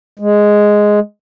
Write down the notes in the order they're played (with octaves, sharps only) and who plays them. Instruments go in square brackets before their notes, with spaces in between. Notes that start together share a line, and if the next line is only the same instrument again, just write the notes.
[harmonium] G#3